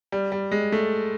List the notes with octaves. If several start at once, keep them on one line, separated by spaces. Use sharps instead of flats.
G3
G3
G#3
A3